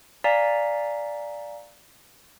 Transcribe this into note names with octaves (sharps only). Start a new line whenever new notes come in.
D5 F5 G#5 A#5 B6